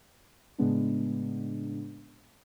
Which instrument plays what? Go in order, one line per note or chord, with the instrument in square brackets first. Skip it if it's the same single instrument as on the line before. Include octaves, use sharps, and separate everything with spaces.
[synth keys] A2 C#3 G#3 B3 D4